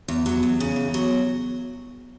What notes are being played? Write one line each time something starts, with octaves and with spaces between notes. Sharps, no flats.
E2
F#3
E2
C#3
E2
F#3